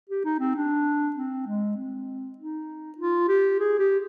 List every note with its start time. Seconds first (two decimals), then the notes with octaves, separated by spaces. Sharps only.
0.10 G4
0.25 D#4
0.40 C4
0.56 D4
1.16 C4
1.47 G#3
1.77 C4
2.38 D#4
2.98 F4
3.28 G4
3.60 G#4
3.79 G4